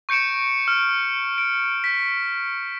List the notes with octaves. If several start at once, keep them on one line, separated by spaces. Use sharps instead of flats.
C#6 G6 C#7 D7 E7
F6
D7
B6